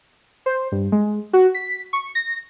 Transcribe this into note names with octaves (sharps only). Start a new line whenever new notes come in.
C5
G2
G#3
F#4
B6
C#6
A#6